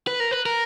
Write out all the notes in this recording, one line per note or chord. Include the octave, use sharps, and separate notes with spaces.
B4
A#4
B4
A#4